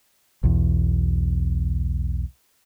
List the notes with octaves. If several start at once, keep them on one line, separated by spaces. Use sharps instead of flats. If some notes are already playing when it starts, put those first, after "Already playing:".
B1 E2